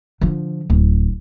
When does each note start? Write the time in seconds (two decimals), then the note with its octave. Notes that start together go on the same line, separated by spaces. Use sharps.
0.21 D3 F3
0.70 D1